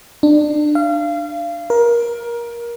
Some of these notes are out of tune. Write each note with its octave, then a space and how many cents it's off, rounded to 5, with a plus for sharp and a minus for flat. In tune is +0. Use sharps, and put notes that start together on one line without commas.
D4 +25
F5 -30
A#4 +20